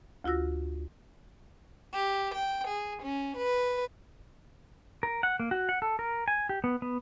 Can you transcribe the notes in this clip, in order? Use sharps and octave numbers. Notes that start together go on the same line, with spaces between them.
D2 F4 F#4 E6 A#6
G4
G5
G#4
C#4
B4
A#4
F#5
A#3
F#4
F#5
A4
A#4
G#5
G4
B3
B3